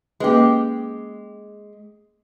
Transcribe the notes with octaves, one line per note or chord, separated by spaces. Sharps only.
G#3 A#3 C#4 G4 B4